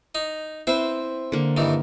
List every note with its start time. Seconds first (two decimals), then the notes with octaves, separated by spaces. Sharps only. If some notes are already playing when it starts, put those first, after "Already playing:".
0.15 D#4
0.67 C4 E4 B4 C5
1.32 D3 A#3
1.57 G2 D#3 E3